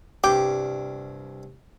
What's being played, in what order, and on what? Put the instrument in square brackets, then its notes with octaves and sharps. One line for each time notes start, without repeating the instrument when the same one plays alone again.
[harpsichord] C2 G2 D6 [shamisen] G4